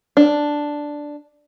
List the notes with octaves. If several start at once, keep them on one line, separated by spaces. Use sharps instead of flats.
D4